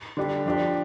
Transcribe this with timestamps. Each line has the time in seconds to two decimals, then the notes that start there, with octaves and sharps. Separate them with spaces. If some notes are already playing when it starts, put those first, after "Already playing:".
0.17 D3 G3 D4 G4
0.46 F3 D4 G4